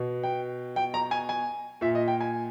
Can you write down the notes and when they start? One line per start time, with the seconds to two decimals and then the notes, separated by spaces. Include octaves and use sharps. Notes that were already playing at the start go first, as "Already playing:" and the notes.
Already playing: B2
0.23 G5
0.76 G5
0.94 A#5
1.11 G#5
1.29 G#5
1.81 A#2 E5
1.95 D#5
2.08 G5
2.21 G#5